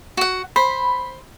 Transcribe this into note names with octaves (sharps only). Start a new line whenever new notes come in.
F#4 F#5
C5 B5